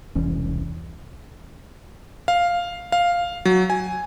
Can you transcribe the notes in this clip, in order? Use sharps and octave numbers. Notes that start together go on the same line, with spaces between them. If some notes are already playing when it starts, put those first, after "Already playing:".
E1 C2 E3 C#4
F5
F5
F#3
G#5